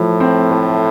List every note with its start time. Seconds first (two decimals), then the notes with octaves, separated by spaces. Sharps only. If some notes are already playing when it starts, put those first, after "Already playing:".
Already playing: A2 F3
0.20 C4
0.51 A3